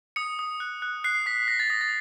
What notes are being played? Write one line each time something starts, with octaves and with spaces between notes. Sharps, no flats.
D#6 C#7
D#6
F#6
F#6
F#6 C7
D#6 B6
F#6 A#6
A6
D#6 A#6
A6